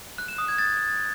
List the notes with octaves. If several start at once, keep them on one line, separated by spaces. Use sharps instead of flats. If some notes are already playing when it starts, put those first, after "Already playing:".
F#6
E7
D#6
G#6
A6